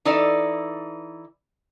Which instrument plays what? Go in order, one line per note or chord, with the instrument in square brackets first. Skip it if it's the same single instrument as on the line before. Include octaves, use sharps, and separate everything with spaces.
[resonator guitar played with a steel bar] E3 D#4 A4 D5